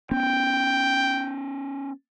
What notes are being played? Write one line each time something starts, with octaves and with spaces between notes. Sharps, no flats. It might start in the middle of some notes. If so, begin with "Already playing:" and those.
B3 C#4 G5